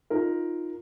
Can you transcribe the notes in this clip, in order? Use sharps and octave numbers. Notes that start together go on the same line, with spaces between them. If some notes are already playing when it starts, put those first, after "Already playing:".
D#4 F4 A#4